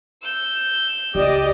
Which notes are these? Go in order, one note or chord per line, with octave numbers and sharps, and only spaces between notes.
E6 G6
C#2 G4 D5 D#5